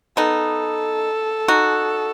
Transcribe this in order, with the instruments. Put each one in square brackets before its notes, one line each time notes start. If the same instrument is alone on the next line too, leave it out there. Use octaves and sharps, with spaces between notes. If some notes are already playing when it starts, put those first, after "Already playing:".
[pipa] B3 D#4 [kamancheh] A4
[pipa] D#4 F#4